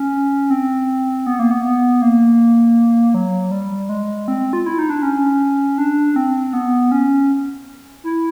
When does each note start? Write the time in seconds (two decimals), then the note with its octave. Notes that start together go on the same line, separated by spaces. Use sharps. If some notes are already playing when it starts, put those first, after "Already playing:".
Already playing: C#4
0.50 C4
1.26 B3
1.39 A#3
1.51 B3
1.64 B3
2.02 A#3
3.14 F#3
3.52 G3
3.89 G#3
4.28 C4
4.53 F4
4.66 E4
4.79 D#4
4.90 D4
5.02 C#4
5.78 D4
6.16 C4
6.53 B3
6.92 C#4
8.04 E4